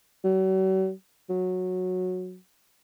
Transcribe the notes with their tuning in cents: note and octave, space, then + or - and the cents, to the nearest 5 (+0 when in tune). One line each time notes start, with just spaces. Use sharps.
F#3 +40
F#3 -15